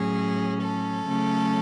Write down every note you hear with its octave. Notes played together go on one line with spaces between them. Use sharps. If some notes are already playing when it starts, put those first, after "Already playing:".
Already playing: A2 F#3 C#4 G#4
A4
C#3 F#3 A3 C#4